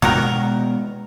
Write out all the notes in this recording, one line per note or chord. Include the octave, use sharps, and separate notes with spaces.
B2 D#3 G#3 B3 F#4 A#4